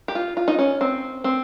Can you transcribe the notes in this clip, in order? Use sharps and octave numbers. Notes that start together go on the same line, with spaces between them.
G4
F4
F4
D#4
C#4
C4
C4